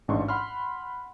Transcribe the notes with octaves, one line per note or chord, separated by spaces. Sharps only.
A1 G#2 D4 C6 C#6
F#5 B5 C6 F6